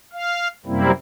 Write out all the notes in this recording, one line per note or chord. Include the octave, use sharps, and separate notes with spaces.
F5
F#2 C3 G3 A#3 C4 E4